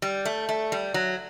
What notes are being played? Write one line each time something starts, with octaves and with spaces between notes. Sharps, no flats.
G3
A3
A3
G3
F#3